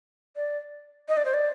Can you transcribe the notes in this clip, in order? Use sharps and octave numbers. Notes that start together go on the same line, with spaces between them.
D5
D#5
D5
C5
D5